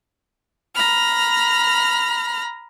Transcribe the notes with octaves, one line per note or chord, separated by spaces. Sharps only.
A#5 B5 F6